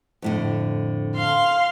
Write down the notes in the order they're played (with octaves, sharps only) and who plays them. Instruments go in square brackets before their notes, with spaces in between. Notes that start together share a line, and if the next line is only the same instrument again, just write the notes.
[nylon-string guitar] F2 A2 D3
[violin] F5 C6